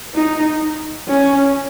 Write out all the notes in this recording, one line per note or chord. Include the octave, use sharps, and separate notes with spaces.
D#4
C#4